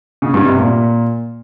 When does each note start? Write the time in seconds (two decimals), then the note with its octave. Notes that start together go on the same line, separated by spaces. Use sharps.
0.22 C#3
0.34 G2
0.46 C3
0.57 A#2